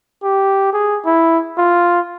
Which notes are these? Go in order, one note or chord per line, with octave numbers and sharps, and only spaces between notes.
G4
G#4
E4
F4